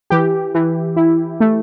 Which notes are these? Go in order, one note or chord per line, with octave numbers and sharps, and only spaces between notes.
E3 G4
E3
E4
A3